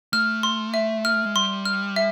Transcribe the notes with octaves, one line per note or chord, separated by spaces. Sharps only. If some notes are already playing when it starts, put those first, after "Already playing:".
A3 F6
C6
E5
F6
G#3
G3 C6
F6
E5